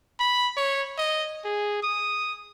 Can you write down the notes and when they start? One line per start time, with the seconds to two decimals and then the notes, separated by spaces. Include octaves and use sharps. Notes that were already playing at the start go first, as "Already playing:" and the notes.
0.20 B5
0.57 C#5
0.98 D#5
1.44 G#4
1.83 D#6